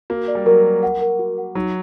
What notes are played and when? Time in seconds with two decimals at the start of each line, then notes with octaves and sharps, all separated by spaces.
0.10 A#3 F#4
0.28 D5
0.35 G3
0.46 F#3 A#4
0.64 A#4
0.83 F#5
1.01 A#4
1.19 F#4
1.38 F#5
1.55 F#3 D#4